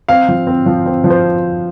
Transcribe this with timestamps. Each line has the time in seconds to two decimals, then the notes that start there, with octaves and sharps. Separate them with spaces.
0.09 C4 F5
0.28 F3
0.47 C4
0.66 F3
0.86 C4
1.04 F3
1.10 C5